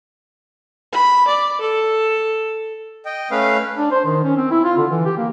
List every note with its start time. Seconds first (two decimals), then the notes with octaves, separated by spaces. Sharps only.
0.92 B5
1.28 D5
1.61 A4
3.05 D#5 G5
3.31 A3 C#4 B4 F5
3.78 D4
3.91 C5
4.05 D#3
4.24 C#4
4.37 C4
4.51 E4
4.64 F4
4.78 D3
4.90 E3
5.05 G4
5.17 A#3